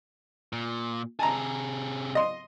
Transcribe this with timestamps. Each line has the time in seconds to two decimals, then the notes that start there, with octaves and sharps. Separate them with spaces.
0.53 A#2
1.19 C3 G#4 A5 A#5
2.15 D#5 C6